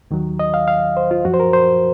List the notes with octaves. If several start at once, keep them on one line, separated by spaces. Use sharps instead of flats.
D#2 D#3 F#3
D#5
F5
F5
C5
F4
F#2 F3 F#4
C5
A#4
C5